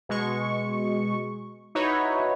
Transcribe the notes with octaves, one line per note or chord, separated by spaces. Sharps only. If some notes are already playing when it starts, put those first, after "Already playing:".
B2 G#3 C#6
D#4 E4 F#4 B4 C#5